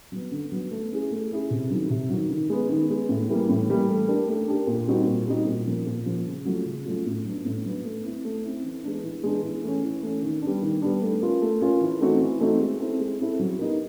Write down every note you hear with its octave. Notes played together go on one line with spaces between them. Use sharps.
F#3 B3
D3
F#3 B3
A3
C#4 E4 G#4
A3
C#4 E4 G#4
C3
D#3 F#3
C3
D#3 F#3
D#3
G#3 B3
D#3
G#3 B3
A2
E3 G3 A#3
A2
E3 G3 A#3
A3
D4 G4 A#4
A3
D4 G4 A#4
A#2
G3 C4 D#4 F#4
A#2
G3 C4 D#4 F#4
A#2
F3 A#3
A#2
F3 A#3
C#3
F#3 A3 C#4 F4
C#3
F#3 A3 C#4 F4
A2
F#3 B3 D4
A2
F#3 B3 D4
A3
C4 E4
A3
C4 E4
E3
G#3 B3 D4
E3
G#3 B3 D4
E3
A3 C#4
E3
A3 C#4
D#3
G3 B3 D4
D#3
G3 B3 D4
A3
C#4 F4 A#4
A3
C#4 F4 A#4
E3
A3 C4 D#4 F#4
E3
A3 C4 D#4 F#4
G#3
C4 E4 A4
G#3
C4 E4 A4
F#3
B3 D#4 G4 A#4